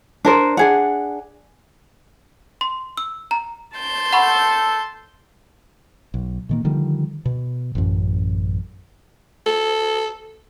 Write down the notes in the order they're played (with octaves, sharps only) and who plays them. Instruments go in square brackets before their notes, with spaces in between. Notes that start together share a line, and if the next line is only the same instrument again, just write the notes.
[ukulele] D4 A#4 C5
D4 G#4 F#5
[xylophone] C6
E6
A#5
[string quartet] A5 C6 G6
[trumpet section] A4 [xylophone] F#5 B5 C#6
[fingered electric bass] B1
A#2 D#3 A#3
D3 D#3 F3 G3
B2
A1 F#2
[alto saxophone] A4